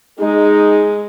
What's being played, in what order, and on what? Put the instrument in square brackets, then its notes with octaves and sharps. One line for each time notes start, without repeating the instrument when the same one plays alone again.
[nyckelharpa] G#3 [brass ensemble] D#4 [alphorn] G#4